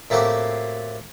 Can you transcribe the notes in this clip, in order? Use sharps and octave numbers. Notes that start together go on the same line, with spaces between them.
A2 A3 A#3 C4 F#4 G4